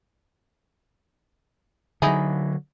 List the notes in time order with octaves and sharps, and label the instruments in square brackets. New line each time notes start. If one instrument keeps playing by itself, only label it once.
[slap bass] D3 F#3 [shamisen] D#4 E4 G#4